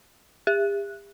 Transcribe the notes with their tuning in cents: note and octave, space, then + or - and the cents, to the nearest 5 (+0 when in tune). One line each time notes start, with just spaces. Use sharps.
G4 +45